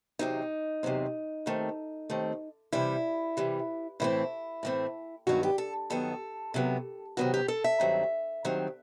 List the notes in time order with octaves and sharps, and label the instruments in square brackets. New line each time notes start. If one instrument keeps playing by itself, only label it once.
[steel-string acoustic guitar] E2 C3 F#3 C4 D#4
E2 C3 F#3 C4
D#2 D#3 A3 C4
D#2 D#3 A3 C4
C3 E3 G3 E4
C3 E3 G3
A2 E3 A3 C4 E4
A2 E3 A3 C4
G2 D#3 F#3 B3 F#4
G4
A4
G2 D#3 F#3 B3 A4
C3 D#3 F#3 B3
C3 D#3 F#3 B3 F#4
G4
A4
E5
G2 D#3 F#3 C4
G2 D#3 F#3 C4